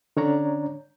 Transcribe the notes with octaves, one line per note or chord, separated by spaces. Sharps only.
D3 C#4 D4 C#5 D5 A#5